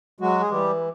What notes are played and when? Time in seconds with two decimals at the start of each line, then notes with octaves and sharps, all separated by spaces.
0.20 F#3 G#3 F#4
0.40 G#4
0.50 E3 G3 G4